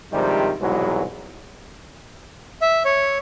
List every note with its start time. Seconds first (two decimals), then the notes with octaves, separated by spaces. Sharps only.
0.13 G2 C3 D#3 F3 G3 G#3
0.61 C2 G#2 B2 E3 F#3 G#3
2.62 E5
2.85 C#5